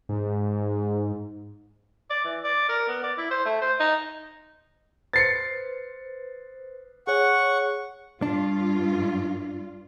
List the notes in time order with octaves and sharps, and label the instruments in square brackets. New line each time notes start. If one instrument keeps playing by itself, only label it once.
[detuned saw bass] G#2
[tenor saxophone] D5
E3
D5
A#4
B3
D5
E4
C5
A3
C5
D#4
[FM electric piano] B4 C5 [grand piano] A6 C7 C#7
[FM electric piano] G#4 C#5 [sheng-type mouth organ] F#5 C#6
[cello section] G2 F4 [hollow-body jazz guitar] D4